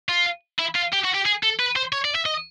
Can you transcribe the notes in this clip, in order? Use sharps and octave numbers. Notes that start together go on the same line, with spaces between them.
F4
E4
F4
G4
F#4
G4
G#4
A4
B4
C5
C#5
D5
E5
D#5